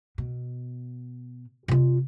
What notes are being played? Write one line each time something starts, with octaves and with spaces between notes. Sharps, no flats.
B2
C3 F4